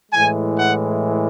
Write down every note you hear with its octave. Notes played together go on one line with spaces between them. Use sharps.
A2 E3 G#3 G#5
F#5